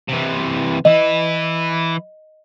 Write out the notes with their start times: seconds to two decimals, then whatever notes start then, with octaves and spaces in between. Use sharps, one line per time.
0.09 C3 E3
0.85 E3 E4 D#5